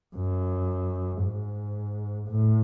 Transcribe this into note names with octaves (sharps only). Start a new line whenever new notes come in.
F#2
G#2
A2